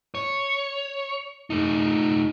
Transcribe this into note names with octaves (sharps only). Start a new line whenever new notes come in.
C#5
A3 D#4